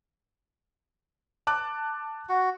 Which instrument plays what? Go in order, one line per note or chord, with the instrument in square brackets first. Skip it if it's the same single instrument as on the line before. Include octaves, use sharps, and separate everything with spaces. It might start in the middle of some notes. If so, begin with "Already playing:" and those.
[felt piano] A5 D6 F#6
[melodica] F#4